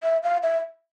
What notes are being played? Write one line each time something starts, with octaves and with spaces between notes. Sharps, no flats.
E5
F5
E5